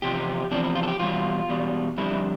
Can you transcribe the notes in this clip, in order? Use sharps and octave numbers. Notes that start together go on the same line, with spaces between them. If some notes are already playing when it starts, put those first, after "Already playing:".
E2 C3 F3 G4
E2 C3 F3 D4
E4
F4
A4
G4
E2 B2 G3 F4
E2 B2 G3
F2 D3 G3 E4